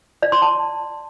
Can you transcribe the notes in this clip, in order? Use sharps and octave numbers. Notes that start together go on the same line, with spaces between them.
D5
C6
A5